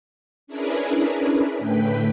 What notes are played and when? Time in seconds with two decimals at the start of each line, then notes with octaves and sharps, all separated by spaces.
0.47 C#4 D4 E4 G#4 A#4 B4
1.59 A2 D3 A3 B4 G5 B5